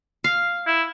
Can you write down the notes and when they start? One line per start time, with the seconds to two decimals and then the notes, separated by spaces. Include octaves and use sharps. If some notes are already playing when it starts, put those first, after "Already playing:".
0.24 F5
0.67 E4